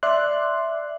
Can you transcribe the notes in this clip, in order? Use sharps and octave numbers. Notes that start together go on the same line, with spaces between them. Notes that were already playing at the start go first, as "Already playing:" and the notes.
D5 E5 C6 F#6